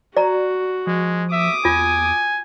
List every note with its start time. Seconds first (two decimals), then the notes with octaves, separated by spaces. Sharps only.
0.17 F#4 D5 A#5
0.87 F3 G#3
1.32 E5 D6 D#6
1.65 E2 F4 G#5